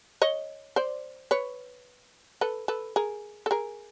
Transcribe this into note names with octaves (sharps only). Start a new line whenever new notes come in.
C#5 D#5
C5 D5
B4 C#5
A4 B4
A4 B4
G#4 A#4
A4
G#4 A#4